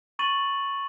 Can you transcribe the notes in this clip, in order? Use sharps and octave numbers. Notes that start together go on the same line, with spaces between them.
B5 C#6 A6 D#7 F#7